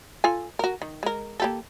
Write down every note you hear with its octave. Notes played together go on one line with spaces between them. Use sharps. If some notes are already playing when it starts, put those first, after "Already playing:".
F4 A4 G#5
F#4 A#4
D#3
G#3 A#4
A#3 G4 A4